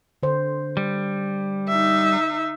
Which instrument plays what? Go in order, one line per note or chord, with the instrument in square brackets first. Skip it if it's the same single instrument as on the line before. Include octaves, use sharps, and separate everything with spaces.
[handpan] D3 C5
[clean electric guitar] G3
[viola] D#4 E5